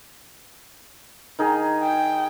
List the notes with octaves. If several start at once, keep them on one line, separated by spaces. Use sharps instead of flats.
D#3 D#4 G#4
G5